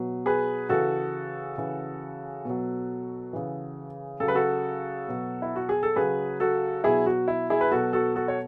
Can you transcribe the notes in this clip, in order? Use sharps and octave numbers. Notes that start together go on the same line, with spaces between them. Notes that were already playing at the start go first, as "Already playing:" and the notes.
Already playing: B2 F#3
G#4 B4
C#3 E3 F#4 A4
C#3 E3
B2 F#3
C#3 E3
C#3 F#3 A4
B4
F#4 A4
B2 F#3
E4
F#4
G#4
A4
C#3 F#3 G#4 B4
F#4 A4
B2 F#3 E4 G#4
F#4
E4
E4 G#4
B4
B2 F#3 F#4 A4
F#4 A4
F#4 A4
C#5